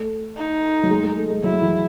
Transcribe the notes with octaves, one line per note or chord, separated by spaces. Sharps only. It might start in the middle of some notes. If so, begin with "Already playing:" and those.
Already playing: A3
D#4
F#3
G#3
G#3
A3
G#3
F#3 E4
E3